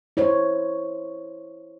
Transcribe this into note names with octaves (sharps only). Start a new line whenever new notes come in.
E4 C5 C#5